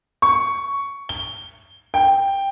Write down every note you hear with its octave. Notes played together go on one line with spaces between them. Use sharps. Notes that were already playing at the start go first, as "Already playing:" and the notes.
C#6
G7
G5